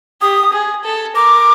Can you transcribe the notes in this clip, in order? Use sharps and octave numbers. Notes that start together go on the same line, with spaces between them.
G4 D#6
G#4
A4
A#4 D6